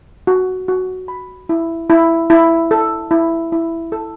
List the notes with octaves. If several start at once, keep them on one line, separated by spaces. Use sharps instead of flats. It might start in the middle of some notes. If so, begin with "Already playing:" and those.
F#4
F#4
B5
E4
E4
E4
A4
E4
E4
A4